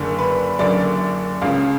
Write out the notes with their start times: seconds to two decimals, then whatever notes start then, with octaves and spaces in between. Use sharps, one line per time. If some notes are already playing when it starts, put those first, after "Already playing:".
Already playing: F#1 F#2 D3
0.18 B4
0.59 F#1 F#2 D3 D5
1.42 C#2 C#3 F5